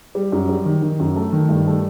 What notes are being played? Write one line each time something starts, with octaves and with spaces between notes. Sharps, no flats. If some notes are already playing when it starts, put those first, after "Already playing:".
G3
F#2
G3
D#3
D#3
F#2
A3
D#3
G2
A3